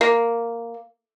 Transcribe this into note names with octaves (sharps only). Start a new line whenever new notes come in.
A#3